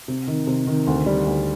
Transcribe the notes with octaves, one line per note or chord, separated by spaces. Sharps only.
C3
D#3
C3
D#3
D2
G3
D2